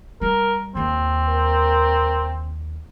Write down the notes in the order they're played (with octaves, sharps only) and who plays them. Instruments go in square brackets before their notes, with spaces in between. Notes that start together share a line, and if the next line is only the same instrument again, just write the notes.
[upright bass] G3 [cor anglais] A#4
[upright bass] D#2 D#3 [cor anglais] C4
[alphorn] A#4